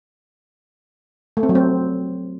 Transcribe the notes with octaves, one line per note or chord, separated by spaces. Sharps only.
A3
C4
F#3
C4